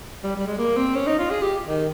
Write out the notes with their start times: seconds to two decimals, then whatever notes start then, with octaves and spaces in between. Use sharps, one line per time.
0.23 G3
0.36 G3
0.46 G#3
0.58 A#3
0.76 C4
0.95 C#4
1.07 D#4
1.19 F4
1.30 G#4
1.42 G4
1.67 D#3